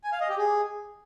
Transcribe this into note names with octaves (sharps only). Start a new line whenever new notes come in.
G#5
F5
D#5
G4
G#4